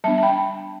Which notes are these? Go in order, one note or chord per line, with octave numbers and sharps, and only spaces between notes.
G3 B3 D4 E5 A5
A5
G5 B5